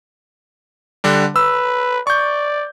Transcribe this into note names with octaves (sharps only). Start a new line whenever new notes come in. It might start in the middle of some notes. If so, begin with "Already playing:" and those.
D3 G3 D4
B4 E6
D5 C#6 G6